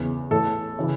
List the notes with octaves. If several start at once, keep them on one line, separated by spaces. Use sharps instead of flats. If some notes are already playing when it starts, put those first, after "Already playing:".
Already playing: E2 C#3 E3
A2 E3 A4
C#3 E3